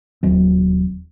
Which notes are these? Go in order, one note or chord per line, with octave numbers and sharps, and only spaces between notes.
E1 D#2 F#3 C4